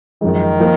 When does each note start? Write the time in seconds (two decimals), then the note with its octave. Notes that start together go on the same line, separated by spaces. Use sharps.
0.21 F#2 D#3 F3 G#3
0.60 F3 A#3 F4